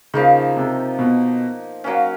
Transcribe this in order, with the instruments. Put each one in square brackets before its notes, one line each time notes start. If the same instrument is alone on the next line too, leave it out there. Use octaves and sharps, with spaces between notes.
[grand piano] C#3 [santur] F3 A#3 D#4
[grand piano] C3
B2
[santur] F#3 A#3 C#4